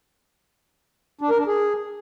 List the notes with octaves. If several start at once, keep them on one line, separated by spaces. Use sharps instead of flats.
D4
A#4
D4
G#4